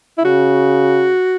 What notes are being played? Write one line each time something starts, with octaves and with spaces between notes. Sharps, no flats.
E4
C#3 F#4